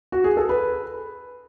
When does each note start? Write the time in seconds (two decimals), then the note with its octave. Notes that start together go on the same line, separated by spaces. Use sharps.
0.12 F#4
0.24 G#4
0.37 A4
0.49 B4